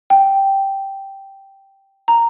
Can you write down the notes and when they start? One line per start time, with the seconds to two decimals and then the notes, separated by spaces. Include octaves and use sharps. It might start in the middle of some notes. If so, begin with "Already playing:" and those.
0.10 G5
2.08 A#5